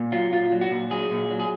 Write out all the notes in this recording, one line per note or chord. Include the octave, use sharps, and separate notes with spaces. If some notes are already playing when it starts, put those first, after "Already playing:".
Already playing: A#2
F#3 F4
A#2 F4
F#3
F#4
A#2
F#3 G#4
A#2
F#3
G#4